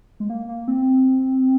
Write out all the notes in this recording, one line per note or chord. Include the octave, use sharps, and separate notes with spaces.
G#3
A#3
A#3
C4